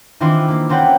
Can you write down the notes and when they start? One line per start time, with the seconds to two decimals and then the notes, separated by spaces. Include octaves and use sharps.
0.20 D#3 E3 C4 D4 E4 F4
0.48 A#3
0.69 A#3 C4 C#4 B4 F#5 G5